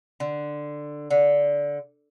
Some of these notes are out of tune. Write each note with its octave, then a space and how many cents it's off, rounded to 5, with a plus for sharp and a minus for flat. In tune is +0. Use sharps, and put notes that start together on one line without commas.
D3 +10
D3 -15